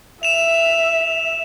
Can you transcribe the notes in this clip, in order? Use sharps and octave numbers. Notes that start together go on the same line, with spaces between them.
E5 E7 F7